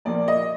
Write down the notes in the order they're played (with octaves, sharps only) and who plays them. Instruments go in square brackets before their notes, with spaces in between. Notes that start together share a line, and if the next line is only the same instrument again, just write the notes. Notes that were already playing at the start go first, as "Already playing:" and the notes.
[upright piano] A#1 A#2 F3 A#3 D5
D#5